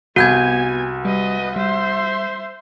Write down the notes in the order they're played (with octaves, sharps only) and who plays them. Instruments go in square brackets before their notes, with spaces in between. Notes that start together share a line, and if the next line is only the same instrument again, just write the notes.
[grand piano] C2 [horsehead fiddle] B3 G#5 [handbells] F#4 G6 G#6
[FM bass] G3 [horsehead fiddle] B4 D#5
[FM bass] G3 [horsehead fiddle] C5 E5